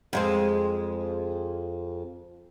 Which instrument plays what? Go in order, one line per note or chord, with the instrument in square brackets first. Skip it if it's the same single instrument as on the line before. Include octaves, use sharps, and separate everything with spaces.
[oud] F2 G#3 C4